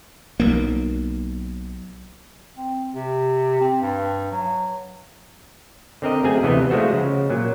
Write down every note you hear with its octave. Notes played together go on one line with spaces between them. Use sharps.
B1 A#3
C4
C3
C4
G2
F#3
D3 C4 A#4 D#5
F#2 A3 C4 G#4 G#5
D2 C3 E3 A3 B3 D#5
F3 G#3 A3 F#4 C5
C#3
A#2 F#3